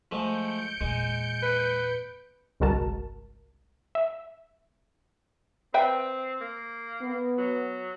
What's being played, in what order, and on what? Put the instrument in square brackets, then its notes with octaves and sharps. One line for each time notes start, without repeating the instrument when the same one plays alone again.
[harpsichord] F3 G#3 A3 [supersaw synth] G6 C#7 D7
[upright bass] E2 A#2 [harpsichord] G#3
[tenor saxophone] B4
[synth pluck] G1 C2 G#3 F#4 A#4 A5
E5
[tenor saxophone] C4 [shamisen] B4 E5 G5
[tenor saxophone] A#3
[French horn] B3
[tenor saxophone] F#3